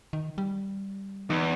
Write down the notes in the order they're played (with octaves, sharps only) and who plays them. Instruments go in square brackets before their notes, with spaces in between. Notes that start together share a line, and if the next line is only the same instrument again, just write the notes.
[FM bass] D#3
G3
[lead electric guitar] E2 [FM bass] D#4